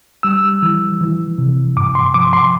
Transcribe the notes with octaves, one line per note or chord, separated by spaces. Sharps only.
G3 E6
E3
E3
C3
G2 D6
C6
F3 D6
C6